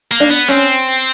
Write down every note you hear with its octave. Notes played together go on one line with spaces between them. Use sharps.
A#3
D4
B3
C4 C#4